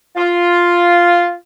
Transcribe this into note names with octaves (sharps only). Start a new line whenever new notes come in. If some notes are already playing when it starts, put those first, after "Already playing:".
F4